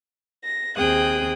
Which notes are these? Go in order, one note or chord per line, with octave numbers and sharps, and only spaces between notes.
A#6
D#2 C4 G#4 G5 D#6 F#6